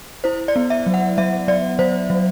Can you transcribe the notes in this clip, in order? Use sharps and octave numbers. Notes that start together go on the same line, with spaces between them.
E4 C5
D5
B3
E5
F#3
F#5
F#3 E5
F#3 D5
F#3 C5
F#3